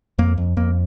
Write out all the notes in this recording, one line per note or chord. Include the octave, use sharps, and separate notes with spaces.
F2 A#3
F2
F2 A#3